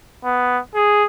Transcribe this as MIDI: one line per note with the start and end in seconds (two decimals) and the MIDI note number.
0.24 0.59 59
0.75 1.04 68